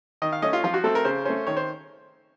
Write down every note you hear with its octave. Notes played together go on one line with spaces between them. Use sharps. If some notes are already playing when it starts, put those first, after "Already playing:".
D#3 D#5
F5
A3 C#4 D#5
F4
F3 F4
F#4
A3 C4 A4
A#4
C#3 C5
A3 C#4 C5
D#3 C#5
C5